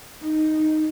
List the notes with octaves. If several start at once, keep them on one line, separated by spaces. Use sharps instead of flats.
D#4